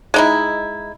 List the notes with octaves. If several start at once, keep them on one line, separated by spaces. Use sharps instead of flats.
G#3 D#4 E4